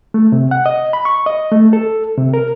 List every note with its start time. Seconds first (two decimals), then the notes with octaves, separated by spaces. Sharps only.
0.14 A3
0.32 C3
0.51 F#5
0.66 D#5
0.93 B5
1.05 C#6
1.26 D#5
1.52 A3
1.73 A4
2.17 C3
2.34 A#4